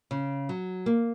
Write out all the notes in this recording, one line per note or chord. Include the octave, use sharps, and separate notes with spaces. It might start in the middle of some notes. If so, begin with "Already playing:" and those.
C#3
F#3
A#3